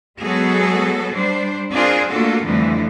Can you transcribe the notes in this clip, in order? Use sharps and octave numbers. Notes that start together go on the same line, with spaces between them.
F#3 G#3 B3 F#4 G#4 A4
G3 D4 C5
C4 D4 F4 G#4 A#4 C5
A3 A#3 D4 F4 F#4 A4
F2 D3 E3 F3 G3 A3